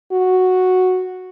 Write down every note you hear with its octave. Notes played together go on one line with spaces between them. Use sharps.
F#4